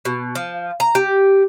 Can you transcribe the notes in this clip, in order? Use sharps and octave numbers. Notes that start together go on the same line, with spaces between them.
B2
F3
A#5
G4